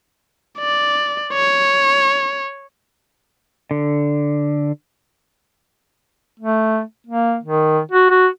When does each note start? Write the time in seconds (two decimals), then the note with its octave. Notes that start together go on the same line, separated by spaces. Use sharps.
0.59 D5
1.33 C#5
3.71 D3
6.40 A3
7.07 A#3
7.43 D#3
7.92 F#4
8.10 F#4